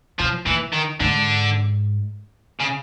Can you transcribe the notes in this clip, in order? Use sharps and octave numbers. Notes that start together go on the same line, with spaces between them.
B2 F3
A#2 E3
D#3
G#2 D3
C#3